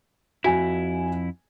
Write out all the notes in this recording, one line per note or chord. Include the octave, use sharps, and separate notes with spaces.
F2 E4 F#4 G#5